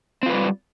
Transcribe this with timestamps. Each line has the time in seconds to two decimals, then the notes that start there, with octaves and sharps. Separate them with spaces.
0.23 C4
0.26 F4
0.30 B4
0.33 G3